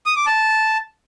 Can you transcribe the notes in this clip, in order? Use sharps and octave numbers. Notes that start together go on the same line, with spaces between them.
D#6
D6
A5